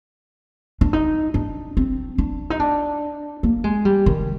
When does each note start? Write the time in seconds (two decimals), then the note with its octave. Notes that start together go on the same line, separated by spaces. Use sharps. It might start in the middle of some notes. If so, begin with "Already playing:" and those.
0.81 D4
0.93 D#4
1.34 D4
1.77 C4
2.18 D4
2.50 D#4
2.60 D4
3.43 A#3
3.64 G#3
3.85 G3
4.06 D#3